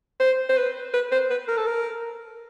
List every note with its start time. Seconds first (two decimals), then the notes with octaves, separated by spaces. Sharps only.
0.20 C5
0.50 C5
0.57 B4
0.94 B4
1.12 C5
1.30 B4
1.48 A#4
1.57 A4
1.66 A#4